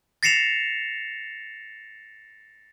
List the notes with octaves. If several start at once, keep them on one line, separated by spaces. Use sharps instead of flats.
A6 A#6 C7 C#7 E7 F7